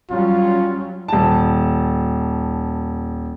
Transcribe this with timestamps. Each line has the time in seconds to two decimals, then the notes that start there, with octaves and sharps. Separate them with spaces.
0.10 F#3 G3 C#4 F4
1.08 D#1 A5